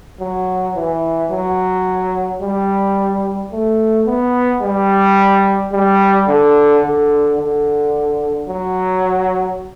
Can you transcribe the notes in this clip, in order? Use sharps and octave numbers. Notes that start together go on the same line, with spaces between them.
F#3
E3
F#3
G3
A3
B3
G3
G3
D3
D3
D3
F#3